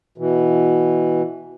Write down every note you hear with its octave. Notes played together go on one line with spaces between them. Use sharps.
B2 E3